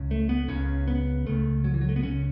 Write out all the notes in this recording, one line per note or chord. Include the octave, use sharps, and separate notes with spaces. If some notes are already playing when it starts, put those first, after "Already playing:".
Already playing: C#2 C#3
A3
B3
C#2 C#3 C#4
B3
C#2 C#3 A3
F#3
E3
F#3
A3
B3
C#2 C#3 C#4